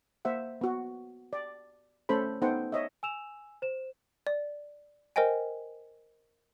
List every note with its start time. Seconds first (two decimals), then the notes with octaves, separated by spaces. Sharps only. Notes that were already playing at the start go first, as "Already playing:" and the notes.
0.25 A#3 C5 E5 F#5
0.61 B3 F#4
1.33 D5
2.09 A3 C#4 A4 C5 B5
2.42 B3 D#4 A4 C5 F#5 G5
2.72 C#5 D#5 E5
3.03 G#5 E6 E7 F7
3.62 C5 E7
4.27 D5
5.16 A#4 C5 D#5 G5 G#5